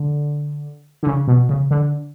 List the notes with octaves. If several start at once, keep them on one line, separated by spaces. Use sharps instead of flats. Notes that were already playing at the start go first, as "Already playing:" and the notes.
Already playing: D3
D3
C#3
B2
C#3
D3